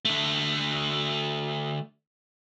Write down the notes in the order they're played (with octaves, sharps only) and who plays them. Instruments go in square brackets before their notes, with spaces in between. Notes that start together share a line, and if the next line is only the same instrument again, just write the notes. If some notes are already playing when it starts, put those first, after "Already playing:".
[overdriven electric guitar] D3 A3